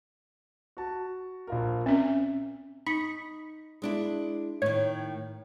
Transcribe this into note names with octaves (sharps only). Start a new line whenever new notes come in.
F#4 A5
A#1 F4 A#4
C4 C#4 E5
D#4 B5 C#6
G#3 D4 E4
A2 D#3 C#5